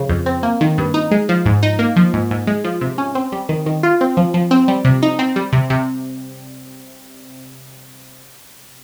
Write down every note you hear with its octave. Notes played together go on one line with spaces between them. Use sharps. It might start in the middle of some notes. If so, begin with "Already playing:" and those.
Already playing: C#3 F3
F2
C4
A#3
D#3
G2
D#4
G#3
F3
G#2
D#4
A#3
F3
G#2
G#2
G#3
F3
C3
C#4
C4
G3
D#3
D#3
F4
C4
F3
F3
C4
G3
C3
D#4
C4
G3
C3
C3